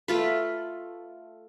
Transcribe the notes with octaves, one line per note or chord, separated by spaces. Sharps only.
A3 F4 B4